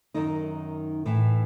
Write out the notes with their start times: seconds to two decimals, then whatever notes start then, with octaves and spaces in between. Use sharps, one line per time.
0.14 F#2 D#3 D#4
1.06 A2 E3